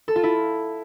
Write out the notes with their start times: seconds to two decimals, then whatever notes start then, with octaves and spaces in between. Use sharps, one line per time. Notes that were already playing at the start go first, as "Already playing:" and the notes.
0.08 A4
0.16 F4
0.23 E4